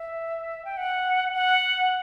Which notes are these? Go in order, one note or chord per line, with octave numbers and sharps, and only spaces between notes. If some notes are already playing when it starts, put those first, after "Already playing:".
Already playing: E5
G5
F#5
F#5